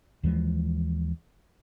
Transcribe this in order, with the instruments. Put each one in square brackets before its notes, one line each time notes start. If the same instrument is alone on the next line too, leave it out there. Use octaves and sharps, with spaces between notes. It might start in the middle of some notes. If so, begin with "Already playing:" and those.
[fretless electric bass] D#2 E3 F3 G#3